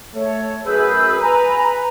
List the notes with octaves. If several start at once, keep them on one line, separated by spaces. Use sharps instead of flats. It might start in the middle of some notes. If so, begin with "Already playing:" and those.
A3 A4 C#5
F#2 G#4 B4 E6 G6
B4 G#5 A#5 B5